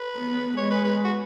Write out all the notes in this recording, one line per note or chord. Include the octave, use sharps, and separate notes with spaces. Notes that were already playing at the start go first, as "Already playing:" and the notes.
Already playing: B4
B3
G#3 C#5
B4
B4
F#4